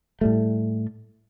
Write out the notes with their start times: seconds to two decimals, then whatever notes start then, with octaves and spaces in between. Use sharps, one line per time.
0.21 A2 G3 A3